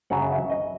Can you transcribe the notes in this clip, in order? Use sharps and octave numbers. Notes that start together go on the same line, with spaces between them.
F#2 C#3 F#3 F#5
E5
D#5